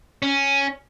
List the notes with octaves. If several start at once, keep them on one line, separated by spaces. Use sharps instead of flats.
C#4